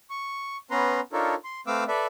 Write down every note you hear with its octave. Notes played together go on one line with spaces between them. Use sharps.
C#6
B3 C#4 B4 A#5 C6
D4 D#4 F4 A4 A#4 C#5
C6
A3 C4 B4 F5 D6 E6
A4 B4 D5 E5